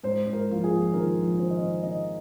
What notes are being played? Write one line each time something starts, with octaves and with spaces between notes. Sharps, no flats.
G#2 C5
G#2
A#4
A#1 F4
G#4
A#1
D#3 A#4
A#1
D#3 C5
D#5
D#3 C5
D#3 D#5